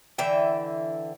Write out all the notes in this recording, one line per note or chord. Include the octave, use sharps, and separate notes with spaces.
D3 E3 E5 G5